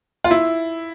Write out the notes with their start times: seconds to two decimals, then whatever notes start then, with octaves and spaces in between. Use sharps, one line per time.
0.24 F4
0.31 E4